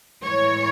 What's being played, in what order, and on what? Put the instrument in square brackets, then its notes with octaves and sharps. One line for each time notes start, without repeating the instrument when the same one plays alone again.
[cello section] A2 E3 G#3 C#5